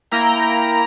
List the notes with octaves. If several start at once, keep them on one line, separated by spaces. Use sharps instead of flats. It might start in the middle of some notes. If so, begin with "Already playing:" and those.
A#3 E4 G5 A#5